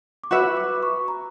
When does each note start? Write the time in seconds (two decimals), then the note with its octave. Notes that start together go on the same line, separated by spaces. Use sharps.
0.24 D6
0.31 F#4 B4 E5 C#6
0.57 D6
0.83 C#6
1.08 A#5